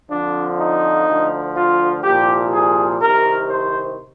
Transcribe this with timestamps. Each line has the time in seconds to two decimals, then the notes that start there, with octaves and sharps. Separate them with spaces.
0.10 F2 D3 F3 D4
0.59 D#4
1.07 D2 D3 F3
1.55 F4
2.03 C2 A#2 F3 G4
2.52 G#4
3.01 C2 C3 D#3 A#4
3.49 C5